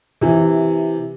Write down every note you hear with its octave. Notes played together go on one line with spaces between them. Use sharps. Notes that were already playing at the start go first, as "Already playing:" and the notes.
C3 E3